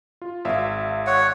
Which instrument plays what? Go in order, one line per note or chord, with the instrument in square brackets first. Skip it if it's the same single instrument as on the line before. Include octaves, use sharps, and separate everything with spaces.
[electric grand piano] F4
G#1 E5 F5
[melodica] C#5 F#5